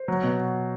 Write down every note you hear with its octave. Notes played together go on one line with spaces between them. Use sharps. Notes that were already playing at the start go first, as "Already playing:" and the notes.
Already playing: C5
F#3
B2